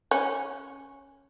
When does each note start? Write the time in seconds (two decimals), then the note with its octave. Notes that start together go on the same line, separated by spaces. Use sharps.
0.11 C#4